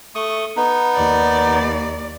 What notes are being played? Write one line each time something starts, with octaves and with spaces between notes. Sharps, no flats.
A3 C#6 D#6
B3 D#4
D#2 D5